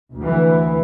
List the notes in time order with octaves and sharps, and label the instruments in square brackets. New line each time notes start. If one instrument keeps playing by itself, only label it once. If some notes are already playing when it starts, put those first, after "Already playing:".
[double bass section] D2 E3